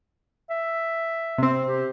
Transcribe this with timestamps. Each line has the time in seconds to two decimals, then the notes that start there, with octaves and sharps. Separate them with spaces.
0.50 E5
1.38 C3 C4
1.67 G4